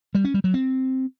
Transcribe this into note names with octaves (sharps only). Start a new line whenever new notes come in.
G3
C#4
G3
F#3
C4